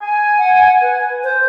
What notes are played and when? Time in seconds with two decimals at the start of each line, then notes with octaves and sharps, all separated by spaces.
0.02 G#5
0.39 F#5
0.82 B4
1.24 C5